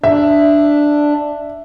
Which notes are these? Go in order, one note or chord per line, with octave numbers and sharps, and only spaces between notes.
D4 E5